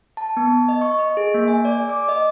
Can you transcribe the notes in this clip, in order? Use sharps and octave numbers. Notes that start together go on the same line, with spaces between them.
A5
B3
D#5
C#6
D#5
G#4
A#3
G#5
D5
D6
D#5